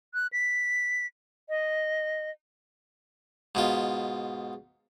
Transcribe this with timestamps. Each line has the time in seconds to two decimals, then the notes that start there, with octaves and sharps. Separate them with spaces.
0.14 F#6
0.32 B6
1.49 D#5
3.55 G#2 B2 F4